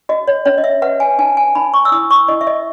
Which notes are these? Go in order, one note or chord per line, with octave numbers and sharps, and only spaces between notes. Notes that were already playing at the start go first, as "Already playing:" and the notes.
F#4 D#5
C#5
C#4 C#5
D#5
E5
B4 F#5
G#5
D#4 G#5
G#5
D#4 B5
C#6
E6
E4 D#6
C#6
E4 D#5
E5
D#5